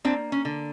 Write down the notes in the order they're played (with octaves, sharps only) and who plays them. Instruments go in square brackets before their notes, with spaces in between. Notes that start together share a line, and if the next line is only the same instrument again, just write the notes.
[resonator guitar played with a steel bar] A#3 C4 D4
C#4
D3